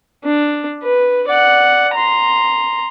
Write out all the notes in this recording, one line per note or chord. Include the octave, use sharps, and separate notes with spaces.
D4
B4
D5 F#5
A#5 C6